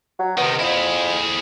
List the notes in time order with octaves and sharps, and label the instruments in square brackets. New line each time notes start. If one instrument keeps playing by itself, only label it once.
[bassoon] F#3
[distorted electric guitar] C3 D#3 [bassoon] B3
[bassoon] F2 [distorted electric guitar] E4 G#4